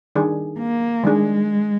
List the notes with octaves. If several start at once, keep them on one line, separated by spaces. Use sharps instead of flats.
D#3 G3 D4 G#4
A#3
D#3 G3 G#3 D4 G#4